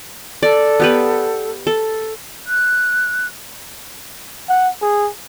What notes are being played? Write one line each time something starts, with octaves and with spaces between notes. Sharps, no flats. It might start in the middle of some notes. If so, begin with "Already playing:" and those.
A4 D5
B3 G4 B4
A4
F#6
F#5
G#4